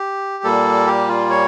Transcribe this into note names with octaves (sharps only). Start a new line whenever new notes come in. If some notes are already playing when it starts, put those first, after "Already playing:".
Already playing: G4
A#2 G3 A#3 A4
G4
F4
C#5